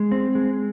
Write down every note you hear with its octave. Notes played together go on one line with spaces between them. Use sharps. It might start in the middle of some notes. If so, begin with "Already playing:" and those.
Already playing: G#3
C4
G#3